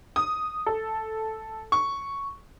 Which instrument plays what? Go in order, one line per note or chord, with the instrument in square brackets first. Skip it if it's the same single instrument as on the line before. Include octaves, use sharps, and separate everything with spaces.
[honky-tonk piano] D#6
A4
C#6